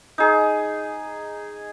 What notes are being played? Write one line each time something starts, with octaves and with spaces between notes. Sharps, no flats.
D#4 G#4